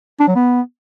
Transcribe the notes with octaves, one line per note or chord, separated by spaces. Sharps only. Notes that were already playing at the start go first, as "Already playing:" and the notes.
D4
F#3
B3